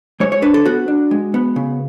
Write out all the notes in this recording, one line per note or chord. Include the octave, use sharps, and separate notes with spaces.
G#3 C#5
C#5
D4 B4
A4
B3 F#4
D4
G#3
B3
C#3